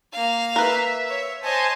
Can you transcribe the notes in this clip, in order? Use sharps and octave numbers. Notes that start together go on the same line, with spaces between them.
A#3 F5
A#4 B4 E5
C#5
C5 C#5 D#5 G#5 A5